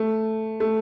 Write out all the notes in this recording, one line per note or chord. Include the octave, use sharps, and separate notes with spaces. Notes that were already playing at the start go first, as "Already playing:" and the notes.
Already playing: A3
A3